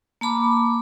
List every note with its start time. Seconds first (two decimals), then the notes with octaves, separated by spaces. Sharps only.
0.21 A#3 A5 B5 D6